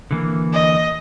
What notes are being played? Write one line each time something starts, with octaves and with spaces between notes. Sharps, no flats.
D3 E3 A#3
D#5